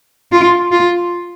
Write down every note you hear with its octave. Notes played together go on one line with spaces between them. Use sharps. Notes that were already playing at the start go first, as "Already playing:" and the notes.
F4
F4